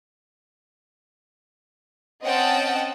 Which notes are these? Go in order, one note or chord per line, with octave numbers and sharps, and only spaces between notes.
C4 C#4 D#5 F#5 G5 A5